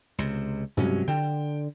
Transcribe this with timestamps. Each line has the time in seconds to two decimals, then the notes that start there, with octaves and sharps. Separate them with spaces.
0.18 C#2 C3
0.77 C2 G2 F#3 G#3 C#4
1.08 D3 G5